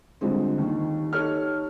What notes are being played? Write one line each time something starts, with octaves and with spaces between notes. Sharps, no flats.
D3 F3 G3 G#3 C4
D#2 D#3
D#4 G4 A4 C#5 F6